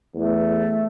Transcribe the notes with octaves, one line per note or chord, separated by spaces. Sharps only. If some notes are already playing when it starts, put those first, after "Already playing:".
E2 A3